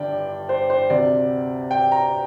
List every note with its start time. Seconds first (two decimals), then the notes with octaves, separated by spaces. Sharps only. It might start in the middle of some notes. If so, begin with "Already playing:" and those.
Already playing: G1 G2 D3 D5 G5
0.49 C5
0.70 C5
0.90 D2 C3 D5
1.71 G5
1.92 A#5